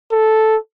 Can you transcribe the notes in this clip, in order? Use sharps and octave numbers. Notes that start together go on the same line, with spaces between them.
A4